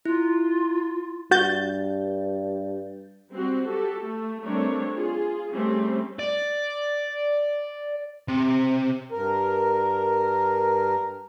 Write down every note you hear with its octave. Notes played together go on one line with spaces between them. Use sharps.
E4 F4
G2 F#4 G6 A6
G3 C4 F#4
F#4 G4 A4
A3
G3 A3 C4 D4 A#4 C#5
F4 G#4
G3 A3 C4 C#4
D5
C3
G2 A#4